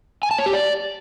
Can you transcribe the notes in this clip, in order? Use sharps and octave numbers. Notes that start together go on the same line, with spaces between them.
G#5
A5
C#5
G4
D5